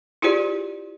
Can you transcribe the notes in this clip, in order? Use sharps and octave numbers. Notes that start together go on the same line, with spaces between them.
E4 F4 G4 G#4 C5 D5